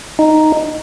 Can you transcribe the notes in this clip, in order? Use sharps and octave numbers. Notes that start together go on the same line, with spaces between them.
D#4